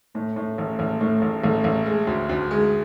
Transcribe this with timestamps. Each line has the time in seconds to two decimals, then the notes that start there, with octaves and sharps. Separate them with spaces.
0.15 A2 A3
0.36 A2
0.58 A1
0.79 A1
1.01 A2 A3
1.22 A1
1.43 A1 A3
1.64 A1
1.86 G#3 A3
2.07 D2
2.29 D2
2.51 G#3